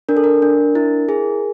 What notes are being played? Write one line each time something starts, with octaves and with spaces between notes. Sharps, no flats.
D4 A#4
A4
A#4
D4
E4
G#4